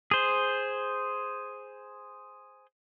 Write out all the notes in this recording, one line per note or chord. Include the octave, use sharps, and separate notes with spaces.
G#4 C5